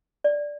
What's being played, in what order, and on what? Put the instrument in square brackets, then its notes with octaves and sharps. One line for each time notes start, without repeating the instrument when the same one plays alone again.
[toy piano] D5